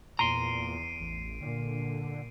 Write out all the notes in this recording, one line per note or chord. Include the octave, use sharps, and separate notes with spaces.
E2 A#2 A#5 C6 C7 D7 D#7
A1
A#2 D3